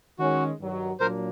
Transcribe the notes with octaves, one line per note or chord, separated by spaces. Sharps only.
D#3 G#3 C#4 F#4
G2 D#3 F#3
A#2 F#3 A#3 D4 A#4 C5